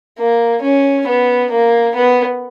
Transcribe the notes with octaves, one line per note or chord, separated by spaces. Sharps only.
A#3
C#4
B3
A#3
B3